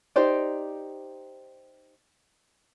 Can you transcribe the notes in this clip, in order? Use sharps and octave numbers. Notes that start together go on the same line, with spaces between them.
D#4 G4 C5 D5